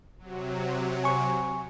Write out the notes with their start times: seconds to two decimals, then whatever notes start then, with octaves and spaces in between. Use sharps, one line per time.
0.18 C3 F#3
1.04 G#5 C#6